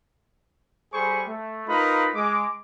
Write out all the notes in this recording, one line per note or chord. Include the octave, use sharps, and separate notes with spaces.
G3 G#4 A4 C5 B5 C#6
A3
D#4 F4 A#4 B4 B5
G#3 D6